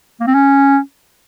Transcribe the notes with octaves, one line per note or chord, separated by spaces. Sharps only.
A#3
C4
C#4